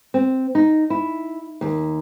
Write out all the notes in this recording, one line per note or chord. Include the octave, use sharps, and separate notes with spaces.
C4
D#4
E4
D#2